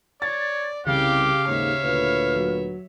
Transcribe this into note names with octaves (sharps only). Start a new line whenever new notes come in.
C#5 D5 A6
C2 C#3 G4 F5 D6
D#2 G#2 C#5 E5
D2 A#2 B4
F#3